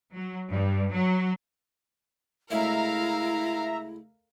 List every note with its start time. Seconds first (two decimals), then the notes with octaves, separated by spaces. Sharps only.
0.13 F#3
0.51 G2
0.92 F#3
2.51 D2 C#3 G#3 E4 A#4 E5 F5 A#5